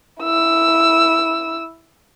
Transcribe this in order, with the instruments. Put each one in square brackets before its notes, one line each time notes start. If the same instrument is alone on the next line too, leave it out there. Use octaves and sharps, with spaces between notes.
[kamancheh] E4 E6